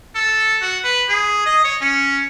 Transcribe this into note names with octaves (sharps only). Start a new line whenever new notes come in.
A4
F#4
B4
G#4
D#5
C#5
C#4